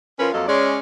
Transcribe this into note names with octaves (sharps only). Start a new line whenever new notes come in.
F3 C#4 E4 F4 A#4 B4
F2 F#3 A#3 A4 D#5 F5
G#3 C#4 D5